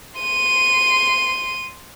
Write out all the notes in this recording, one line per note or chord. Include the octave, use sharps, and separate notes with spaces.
C6 D#7